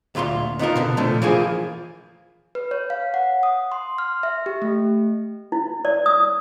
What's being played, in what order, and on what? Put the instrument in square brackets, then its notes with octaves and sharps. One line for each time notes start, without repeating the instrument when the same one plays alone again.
[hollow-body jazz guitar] D2 A#2 F4 B5 C6
B3 D#4 F4 A#4
B2 D3 B3
A#2 D3 F3 A3
E3 F3 A#3 F4 G#4
[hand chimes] B4
C#5
F5
F#5
D#6
C6
F6
E5
G4
A3
[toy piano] E4
D5
D#6